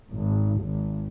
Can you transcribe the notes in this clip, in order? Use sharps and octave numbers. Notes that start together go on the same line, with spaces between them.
G#1
G#1